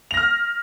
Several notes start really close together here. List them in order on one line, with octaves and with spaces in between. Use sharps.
F7 A#6 F6